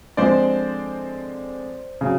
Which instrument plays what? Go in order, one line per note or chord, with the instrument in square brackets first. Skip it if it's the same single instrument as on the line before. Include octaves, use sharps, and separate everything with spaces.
[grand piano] D3 F3 G#3 C4 C5 D5
C#3 F#3